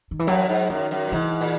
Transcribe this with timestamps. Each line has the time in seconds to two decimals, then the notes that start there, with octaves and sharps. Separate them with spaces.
0.11 D#3
0.19 E3
0.27 F#2 F#3
0.49 G#2
0.70 F#2 D#3
0.91 F#2
1.07 A#2
1.12 G#2 E3
1.41 A#2